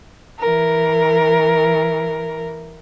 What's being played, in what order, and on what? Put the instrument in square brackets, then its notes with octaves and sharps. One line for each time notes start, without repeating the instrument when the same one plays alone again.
[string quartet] E3 A#4